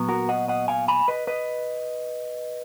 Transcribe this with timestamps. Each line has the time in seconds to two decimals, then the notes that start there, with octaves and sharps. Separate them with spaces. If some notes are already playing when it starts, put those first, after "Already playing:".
Already playing: A#2 F#3 B3
0.09 F#4 A#4
0.29 D#5 F#5
0.48 D#5 F#5
0.68 F5 G#5
0.88 G#5 B5
1.08 B4 D#5
1.27 B4 D#5